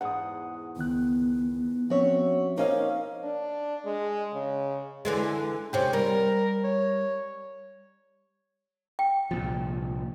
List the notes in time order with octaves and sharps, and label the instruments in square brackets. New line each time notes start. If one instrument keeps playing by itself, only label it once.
[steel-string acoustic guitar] E2 G#2 [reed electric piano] F#5 D#6
[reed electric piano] C#2 D#3 F#6 [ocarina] B3
[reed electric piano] F3 C4 C#4 [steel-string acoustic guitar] F#4 C#5 E5
[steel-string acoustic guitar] A#3 C#4 F5 [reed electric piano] D#4 A#4 D#5 [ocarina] C5
[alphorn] D4
G#3
C#3
[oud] D3 E3 G#3
[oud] D#2 C3 C#4 [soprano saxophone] G5
[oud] G3 [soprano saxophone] A#4
[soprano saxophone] C#5
[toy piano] G5
[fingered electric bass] C2 A#2 F3